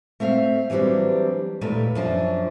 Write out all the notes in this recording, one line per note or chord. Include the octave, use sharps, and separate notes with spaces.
A3 C4 E5 F5
E3 F#3 G3 C4 D4
D#2 A#2 A3 A#4 B4
F#2 F3 D4